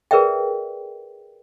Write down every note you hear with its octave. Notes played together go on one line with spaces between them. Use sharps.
G#4 A#4 B4 D5 E5 G5